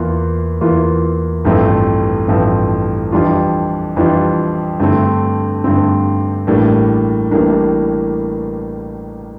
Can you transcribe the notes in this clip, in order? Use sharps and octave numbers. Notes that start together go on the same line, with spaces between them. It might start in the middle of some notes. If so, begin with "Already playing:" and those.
Already playing: E2 E3 A#3 F4
E2 E3 A#3 F4
A1 G2 F3 A3 C4
A1 G2 F3 A3 C4
F2 E3 G3 D4 F4
F2 E3 G3 D4 F4
G2 D3 A3 C4
G2 D3 A3 C4
A1 A2 G3 A#3 D4
A1 A2 G3 A#3 D4